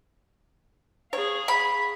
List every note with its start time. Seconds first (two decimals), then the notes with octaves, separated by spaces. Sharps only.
1.13 G#4 C#5 F5
1.48 B5